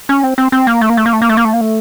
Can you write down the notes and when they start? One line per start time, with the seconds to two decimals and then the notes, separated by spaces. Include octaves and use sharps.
0.09 C#4
0.23 C4
0.38 C4
0.52 C4
0.67 A#3
0.81 A3
0.90 A#3
0.97 A3
1.06 A#3
1.13 A3
1.22 A#3
1.29 A3
1.37 A#3
1.45 A3
1.53 A#3
1.61 A3